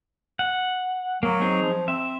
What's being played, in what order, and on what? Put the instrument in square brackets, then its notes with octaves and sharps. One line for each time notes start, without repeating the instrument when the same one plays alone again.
[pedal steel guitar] F#5
[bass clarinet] F#3 [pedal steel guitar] A#3
[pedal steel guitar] C4 D#4 G#4
[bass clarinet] F3
[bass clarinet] C4 [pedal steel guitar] E5